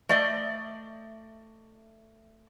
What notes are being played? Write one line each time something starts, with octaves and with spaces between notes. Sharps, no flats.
A3 D5 D#5